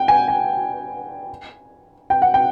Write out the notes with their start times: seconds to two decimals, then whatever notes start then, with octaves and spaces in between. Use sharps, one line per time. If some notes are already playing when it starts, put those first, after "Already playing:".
Already playing: F#5 G5
0.08 G#5
0.28 G#5
2.10 G5
2.22 F#5
2.34 G5